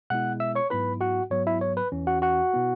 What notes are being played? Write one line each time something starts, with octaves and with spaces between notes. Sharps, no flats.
B2 G#3 B3 E4 F#5 F#6
E5 E6
C#5 C#6
G#2 F#3 B3 E4 B4 B5
F#4 F#5
G#2 F#3 B3 C#5
E4 E5
C#5
B4
E2 E3 C#4
F#4 F#5
F#4 F#5
B2 B3 E4